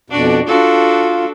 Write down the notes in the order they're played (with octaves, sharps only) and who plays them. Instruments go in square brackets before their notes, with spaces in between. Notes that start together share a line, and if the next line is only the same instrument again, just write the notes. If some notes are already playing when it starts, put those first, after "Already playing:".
[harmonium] F2 B2 [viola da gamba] D4 F#4 D5
[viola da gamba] D4 F#4 A4 [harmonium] F4